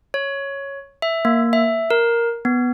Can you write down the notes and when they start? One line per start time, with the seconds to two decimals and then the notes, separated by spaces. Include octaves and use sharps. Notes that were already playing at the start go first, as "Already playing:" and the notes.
0.14 C#5
1.02 E5
1.25 A#3
1.53 E5
1.91 A#4
2.45 B3